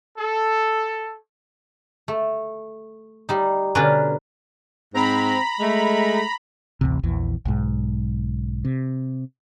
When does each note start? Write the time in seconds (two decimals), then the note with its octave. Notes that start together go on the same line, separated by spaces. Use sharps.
0.18 A4
2.08 A3
3.29 G3 D#4
3.75 B2 D3 C#4 D4 A#4 B4
4.94 G#2 C4 A#5 B5
5.60 G#3 A3
6.81 A1 D2 C3
7.03 A#1 E2 E3
7.45 B1 G#2
8.65 C3